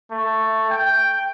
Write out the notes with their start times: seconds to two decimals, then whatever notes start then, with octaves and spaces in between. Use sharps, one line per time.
0.11 A3
0.70 G5